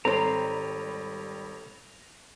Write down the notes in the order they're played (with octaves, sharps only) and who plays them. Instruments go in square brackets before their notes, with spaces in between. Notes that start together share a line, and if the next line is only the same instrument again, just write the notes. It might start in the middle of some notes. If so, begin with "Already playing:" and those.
[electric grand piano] G#1 G3 B5 [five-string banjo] C4 C5 [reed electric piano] A4 C#5 [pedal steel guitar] A#5